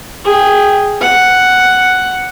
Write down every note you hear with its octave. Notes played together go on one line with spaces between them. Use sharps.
G#4 G5
F#5